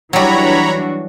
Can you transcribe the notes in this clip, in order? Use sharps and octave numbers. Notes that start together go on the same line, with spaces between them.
E3 F#3 G3 D4 F#4 C#5 A#5 B5